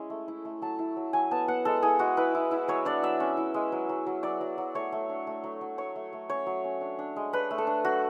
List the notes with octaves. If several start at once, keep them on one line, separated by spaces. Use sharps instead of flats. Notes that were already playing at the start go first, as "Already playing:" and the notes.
Already playing: G#3 C#4 E4
A3
E4
A3
F#3 A5
E4
F#3
F#3 G#5
B3 A5
B3 F#5
G#3 A4
E4 G#4
G#3 F#4
E4 B4
E4
E4
F#3 C#5
D4 D5
F#3 E5
C#4
E4
G#3
F#3
F#3
F#3
F#3 D5
F#3
F#3
A3 C#5
A3
D4
A3
F#3
F#3
A3 C#5
A3
A3
C#4 C#5
F#3
C#4
D4
D4
G#3
D4 B4
A3
A4
D4
F#3 F#4